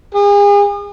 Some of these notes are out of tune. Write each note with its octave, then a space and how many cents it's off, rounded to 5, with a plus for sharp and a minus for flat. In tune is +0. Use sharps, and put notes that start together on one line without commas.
G#4 -40